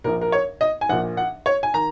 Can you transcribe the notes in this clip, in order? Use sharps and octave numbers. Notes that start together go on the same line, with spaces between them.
A#1 A#2 A#4
A#4
C#5
D#5
G#5
A#1 A#2 F#5
F#5
C#5
G#5
D#3 A#5